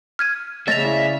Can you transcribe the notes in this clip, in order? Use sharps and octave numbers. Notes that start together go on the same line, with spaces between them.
F6 G#6 D#7
C#3 A3 C#5 D#5 E5 A6 A#6 F7
E4 D5